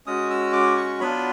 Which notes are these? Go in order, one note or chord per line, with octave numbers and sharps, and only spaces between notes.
G#3 C#4 F#4 D#6
E6
D6
C#6
F#3 B3 D4 F4 B5